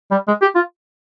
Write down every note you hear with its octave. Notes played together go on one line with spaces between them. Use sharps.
G3
G#3
G4
F4